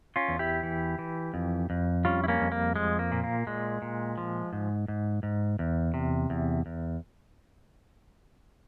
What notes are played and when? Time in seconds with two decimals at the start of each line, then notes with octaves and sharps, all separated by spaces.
0.16 C#4 F4
0.28 E2
0.39 E4 G4
0.63 E3
0.99 E3
1.34 F2
1.70 F2
2.05 G3 C#4 F4
2.24 E4
2.28 A#3 C#4
2.41 F2
2.52 A#3
2.76 F3 G#3
2.99 A#3
3.12 A#2
3.24 A#3
3.47 A#2 G#3
3.82 A#2
4.18 F3
4.53 G#2
4.88 G#2
5.23 G#2
5.59 E2
5.94 C3
6.30 E2
6.66 E2